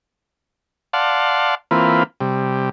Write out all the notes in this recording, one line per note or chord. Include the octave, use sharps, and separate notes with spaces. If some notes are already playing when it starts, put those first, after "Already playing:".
D5 F5 F#5 A5 C6
E3 A#3 C4 F4 B4
C3 G3